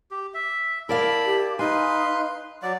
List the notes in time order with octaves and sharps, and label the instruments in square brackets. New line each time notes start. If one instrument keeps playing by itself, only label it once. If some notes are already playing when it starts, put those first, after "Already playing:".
[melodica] G4
E5
[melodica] E4 A5 B5 [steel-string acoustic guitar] A#4 D5 F5
[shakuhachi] G4
[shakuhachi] D#4 [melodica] B4 F5 C6 [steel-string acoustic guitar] G#5
[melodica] F#3 D5 [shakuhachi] F#5